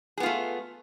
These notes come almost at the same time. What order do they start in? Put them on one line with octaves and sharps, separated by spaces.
G#4 B3 F4 A3